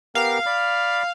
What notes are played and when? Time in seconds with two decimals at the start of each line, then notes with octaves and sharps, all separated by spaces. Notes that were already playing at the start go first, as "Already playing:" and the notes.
0.15 B3 G4 A#4 F5
0.46 D5 B5